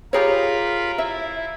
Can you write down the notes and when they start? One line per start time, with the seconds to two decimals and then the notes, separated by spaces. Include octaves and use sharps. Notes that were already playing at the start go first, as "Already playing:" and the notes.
0.13 F4 G4 G#4 A#4 C#5 B5
0.98 E4 E5